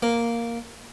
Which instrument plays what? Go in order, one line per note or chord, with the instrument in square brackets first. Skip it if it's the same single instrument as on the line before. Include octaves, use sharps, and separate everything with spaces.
[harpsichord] A#3